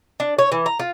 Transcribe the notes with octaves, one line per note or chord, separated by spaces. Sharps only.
D4
C#5
E3
A#5
F4